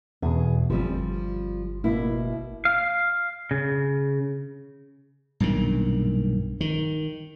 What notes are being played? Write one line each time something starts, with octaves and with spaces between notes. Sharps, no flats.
E2 B2 G#4
G1 F3 G3 C4
B2 A#3 E4
F5
C#3
B1 G2 A#2 D#3
D#3